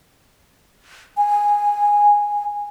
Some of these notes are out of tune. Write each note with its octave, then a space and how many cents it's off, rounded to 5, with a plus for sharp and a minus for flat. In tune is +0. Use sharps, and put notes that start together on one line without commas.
G#5 -10